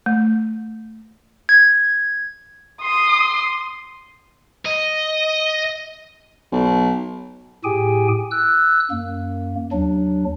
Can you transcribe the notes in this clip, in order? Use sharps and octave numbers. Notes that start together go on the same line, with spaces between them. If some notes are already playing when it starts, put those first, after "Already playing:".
A3
G#6
C6 D#6
D#5
B1
A2 G4 G#4 G5 G#5
E6 F#6
F#2 A#3
D#2 F#3 D4